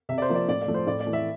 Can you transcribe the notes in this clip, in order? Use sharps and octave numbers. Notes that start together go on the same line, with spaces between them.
C3 E5
D5
C5
F3 A#3
D5
A2 D5
D5
F3 A3
C5
A2 D5
D5
E3 A3
E5